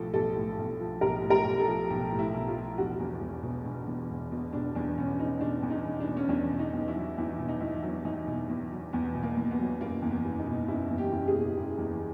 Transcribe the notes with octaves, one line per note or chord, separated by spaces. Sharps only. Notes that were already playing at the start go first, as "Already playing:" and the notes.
Already playing: B1 A2 F3 A4
B1 A4
A2
B1
F3
B1 A#4
A2
A#4
B1
A4
F3
B1 G4
A2
E4
B1
F4
F3
E1 F#4
E2
E1
B2
E1
E2
E1
B2
E1 D4
E2 D4
E1 C#4
B2 D#4
E1 D4
E2
D#4
E1
D4
B2
C#4
E2 D4
B2
D#4
E2
E4
F#3
E2 E4
B2
D#4
E2 E4
F#3
E2 D#4
B2
E2
F#3
E2 B3
B2
A#3
E2
B3
F#3
F#1 A#3
E2
B3
F#1
D#4
B2
F#1 E4
E2
G4
F#1
G#4
B2
F#1
E2